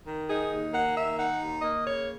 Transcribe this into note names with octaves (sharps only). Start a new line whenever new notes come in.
D#3
D#4 G#4
D#2
A#3 F#5
D#3 E5
D#4 F#5
D#2
A#3 D#5
C#3 C#5